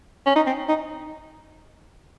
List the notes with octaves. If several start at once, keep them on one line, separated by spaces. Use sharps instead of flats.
C#4
D#4
C4
D#4